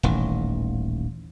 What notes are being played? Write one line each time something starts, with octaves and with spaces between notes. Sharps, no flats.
D#1 A1 D#3